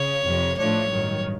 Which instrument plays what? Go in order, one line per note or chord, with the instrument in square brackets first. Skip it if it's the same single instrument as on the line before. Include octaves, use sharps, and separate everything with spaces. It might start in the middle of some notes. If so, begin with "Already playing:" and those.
Already playing: [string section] C#3 [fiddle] C#5
[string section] F2 C3 D#3
[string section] A2 F3 A3 D4 [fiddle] C#5
[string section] A1 G2 D#3 F#3